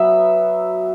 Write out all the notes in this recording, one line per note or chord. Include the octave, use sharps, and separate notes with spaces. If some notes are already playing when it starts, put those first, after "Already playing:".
Already playing: F#3 B3 E5